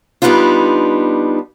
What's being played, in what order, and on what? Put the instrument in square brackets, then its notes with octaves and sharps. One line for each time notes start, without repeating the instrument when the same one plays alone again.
[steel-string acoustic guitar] G3 B3 D4 D#4 F4